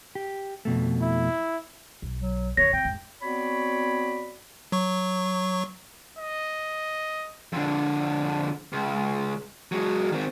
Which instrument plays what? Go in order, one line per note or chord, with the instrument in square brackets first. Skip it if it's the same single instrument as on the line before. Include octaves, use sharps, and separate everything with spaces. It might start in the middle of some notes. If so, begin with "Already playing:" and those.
[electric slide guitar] G4
F2 B2 A3
[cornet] E4
[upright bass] B1
[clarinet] F#3
[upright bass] D#2 C3 [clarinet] C#5 [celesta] A#6
[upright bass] C3 [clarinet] G5
[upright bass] E2 G#2
[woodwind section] B3 C4 F#4 C#5 D5 B5
[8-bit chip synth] F#3 C#6
[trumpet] D#5
[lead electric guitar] F2 D3
C#2
F#3 G#3
D#3 C4